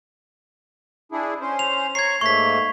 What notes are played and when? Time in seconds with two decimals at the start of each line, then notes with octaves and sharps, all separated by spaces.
1.12 D4 E4 G#4
1.41 C#4 C5
1.59 F7
1.95 C#5 A#5 C#6 G#6 C7
2.21 G#2 A3 A#3 C#6 B6